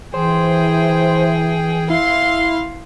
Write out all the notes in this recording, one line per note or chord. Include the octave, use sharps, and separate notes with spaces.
E3 G#4 C5 G5
E4 F5 C6